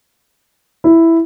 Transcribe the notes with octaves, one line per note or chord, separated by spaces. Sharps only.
E4